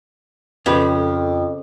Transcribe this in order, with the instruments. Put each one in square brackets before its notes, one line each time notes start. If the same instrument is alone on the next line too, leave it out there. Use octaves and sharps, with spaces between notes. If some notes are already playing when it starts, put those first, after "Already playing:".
[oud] F2 [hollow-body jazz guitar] C#3 G4 B4